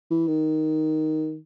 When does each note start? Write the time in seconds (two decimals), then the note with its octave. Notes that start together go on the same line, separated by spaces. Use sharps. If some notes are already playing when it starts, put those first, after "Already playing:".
0.11 E3
0.28 D#3